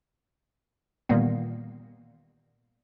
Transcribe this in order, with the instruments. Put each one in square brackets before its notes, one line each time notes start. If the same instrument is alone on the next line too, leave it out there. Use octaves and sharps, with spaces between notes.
[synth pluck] A#2 D#3 E3 G3 A#3 B3